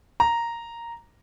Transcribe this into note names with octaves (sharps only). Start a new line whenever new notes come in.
A#5